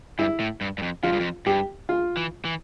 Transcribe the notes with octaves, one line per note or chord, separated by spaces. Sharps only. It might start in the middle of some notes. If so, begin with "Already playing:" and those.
G2 E4
A2
G2
G2
F2
F2 F4
G2
F2
G2 G4
F4
E3
E3